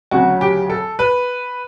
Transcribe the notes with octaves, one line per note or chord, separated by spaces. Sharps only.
D2 C#3 F#3 F#4
G4
A4
B4